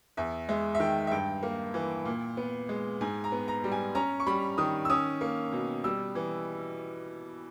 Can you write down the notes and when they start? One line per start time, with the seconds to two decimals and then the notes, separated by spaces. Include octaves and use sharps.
0.17 E2 E5
0.49 G#3 E5
0.75 E5
0.80 D#3 G5
1.07 E5
1.11 G2 G5
1.43 A#3
1.74 E3
2.05 A#2
2.37 B3
2.69 G#3
3.01 G#2 G#5
3.24 A#5
3.32 B3
3.48 A#5
3.64 G3
3.72 G#5
3.95 C#4 A#5
4.20 C#6
4.27 G3 B5
4.58 D#3 D#6
4.85 E6
4.90 C#4 D#6
5.21 A#3
5.52 B2
5.84 G3 E6
6.15 E3